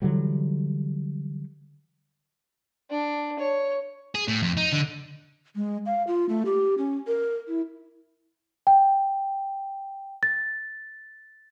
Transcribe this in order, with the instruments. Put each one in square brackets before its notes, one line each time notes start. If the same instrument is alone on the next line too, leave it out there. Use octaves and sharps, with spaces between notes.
[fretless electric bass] D3 E3 F#3 G3
[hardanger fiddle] D4
C#5
[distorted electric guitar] G#4
A2
F2
D#4
D3
[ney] G#3
F5
F4
A3
G4
C#4
A#4
E4
[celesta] G5
A6